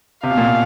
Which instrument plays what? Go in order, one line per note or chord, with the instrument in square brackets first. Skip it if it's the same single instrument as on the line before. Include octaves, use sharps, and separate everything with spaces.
[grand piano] C3 [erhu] F5
[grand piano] B2
A#2
B2